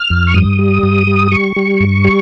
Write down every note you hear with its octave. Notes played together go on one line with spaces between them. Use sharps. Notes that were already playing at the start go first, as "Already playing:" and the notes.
Already playing: F6
F2
C#6
G2 D#6
G3
G2
G3
G3 C#6
G3
G2
G3